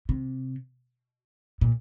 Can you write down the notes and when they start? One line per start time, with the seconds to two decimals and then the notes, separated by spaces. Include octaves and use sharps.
0.09 C3
1.61 A#2